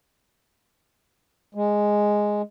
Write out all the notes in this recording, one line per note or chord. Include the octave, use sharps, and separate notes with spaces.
G#3